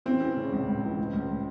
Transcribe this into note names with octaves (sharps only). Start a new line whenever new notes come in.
E3 C4
E3
C#3
C#2
C#2
E3
C#2
C#2